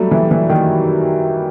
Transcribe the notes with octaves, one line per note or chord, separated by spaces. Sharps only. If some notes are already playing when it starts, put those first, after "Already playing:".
Already playing: F#3 G3 A3
E3
E3
D#3